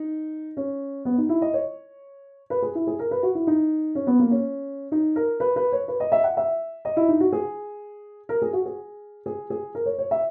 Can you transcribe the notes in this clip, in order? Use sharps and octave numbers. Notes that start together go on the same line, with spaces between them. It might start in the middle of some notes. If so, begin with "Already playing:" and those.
Already playing: D#4
C#4
B3
D#4
E4
D#5
C#5
B4
G#4
E4
G#4
A#4
B4
F#4
E4
D#4
C#4
B3
A#3
C#4
D#4
A#4
B4
B4
C#5
B4
D#5
E5
F#5
E5
D#5
E4
D#4
F#4
G#4
A#4
G#4
F#4
G#4
G#4
G#4
A#4
C#5
C#5
E5